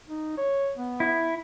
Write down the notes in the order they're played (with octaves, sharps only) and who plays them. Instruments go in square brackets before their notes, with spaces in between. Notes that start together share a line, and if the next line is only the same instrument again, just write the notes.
[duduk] D#4
C#5
B3
[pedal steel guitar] E4